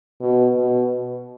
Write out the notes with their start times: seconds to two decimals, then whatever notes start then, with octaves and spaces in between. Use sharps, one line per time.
0.21 B2
0.57 B2